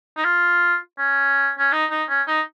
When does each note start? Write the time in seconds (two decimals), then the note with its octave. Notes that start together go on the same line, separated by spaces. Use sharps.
0.17 D#4
0.24 F4
0.99 C#4
1.59 C#4
1.72 D#4
1.91 D#4
2.09 C#4
2.28 D#4